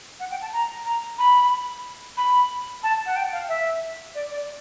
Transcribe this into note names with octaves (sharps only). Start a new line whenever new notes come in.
F#5
G5
A5
A#5
A#5
B5
B5
A5
F#5
G5
F5
E5
D5
D5